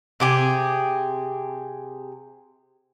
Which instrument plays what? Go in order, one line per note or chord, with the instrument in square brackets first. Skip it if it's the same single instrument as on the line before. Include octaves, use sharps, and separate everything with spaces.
[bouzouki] C3 G4 G#4